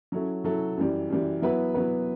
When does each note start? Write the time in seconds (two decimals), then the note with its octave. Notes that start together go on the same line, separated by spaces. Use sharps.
0.12 F#3 C#4 E4 A4
0.44 F#3 C#4 E4 A4
0.77 F#2 E3 G3
1.09 F#2 E3 G3
1.42 F#3 B3 E4 B4
1.74 F#3 B3 E4 B4